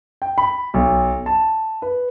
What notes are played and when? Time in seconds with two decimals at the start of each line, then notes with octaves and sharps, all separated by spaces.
0.22 G5
0.38 B5
0.74 B1
1.26 A5
1.82 B4